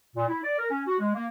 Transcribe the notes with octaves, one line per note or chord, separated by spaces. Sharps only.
A#2
E4
D5
A#4
C#4
F#4
G#3
A#3